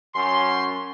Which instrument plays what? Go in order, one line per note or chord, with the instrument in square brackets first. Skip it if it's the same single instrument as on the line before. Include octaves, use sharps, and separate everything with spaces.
[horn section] F#2 C#4 C6